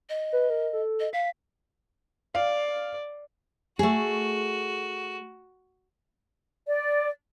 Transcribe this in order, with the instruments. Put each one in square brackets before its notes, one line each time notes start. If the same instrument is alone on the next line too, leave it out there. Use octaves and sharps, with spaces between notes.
[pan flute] D#5
[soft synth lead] B4
A#4
A4
[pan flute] D#5
[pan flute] F5 [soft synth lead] B6
[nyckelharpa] D5 [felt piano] F5
[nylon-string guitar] A3 G#4 [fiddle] F#4
[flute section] D5